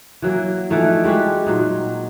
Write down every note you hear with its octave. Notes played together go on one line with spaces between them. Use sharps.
E3 F#3 A#3
E3 F3 A3 D#4
G3 G#3 F#4 G4
A#2 F#3 D#4